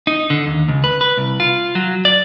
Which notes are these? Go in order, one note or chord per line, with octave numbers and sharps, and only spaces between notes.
D#4
D3
D#2
C#2
B4
B4
C2
F4
F#3
D5